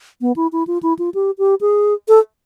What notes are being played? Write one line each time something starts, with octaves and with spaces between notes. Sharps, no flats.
B3
E4
E4
F4
E4
F4
G4
G4
G#4
A4